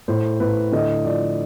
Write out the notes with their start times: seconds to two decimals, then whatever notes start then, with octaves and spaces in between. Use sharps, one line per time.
0.08 A2 C5
0.40 A2 B4
0.72 D3 D#5
1.05 F3 D5